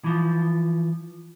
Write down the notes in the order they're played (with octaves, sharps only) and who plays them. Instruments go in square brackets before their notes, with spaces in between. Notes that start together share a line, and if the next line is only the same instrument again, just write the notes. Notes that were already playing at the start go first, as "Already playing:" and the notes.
[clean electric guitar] E3 F3